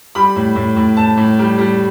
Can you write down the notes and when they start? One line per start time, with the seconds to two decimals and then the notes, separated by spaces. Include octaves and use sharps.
0.15 G3 B5
0.36 A2
0.56 A2
0.76 A2
0.97 A2 A5
1.17 A2
1.39 G3
1.58 G3